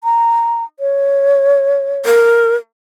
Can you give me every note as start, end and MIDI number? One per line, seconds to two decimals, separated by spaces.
0.04 0.64 82
0.80 2.05 73
2.06 2.55 70